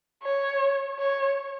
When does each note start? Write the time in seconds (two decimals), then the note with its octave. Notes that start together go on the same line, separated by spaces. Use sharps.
0.23 C#5
0.99 C#5